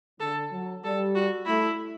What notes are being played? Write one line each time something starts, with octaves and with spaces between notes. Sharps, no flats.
D3 A4
F#3
G3 A4
F#4
A3 E4